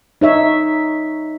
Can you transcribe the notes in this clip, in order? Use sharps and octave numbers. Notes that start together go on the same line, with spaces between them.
D#4 C#5 E5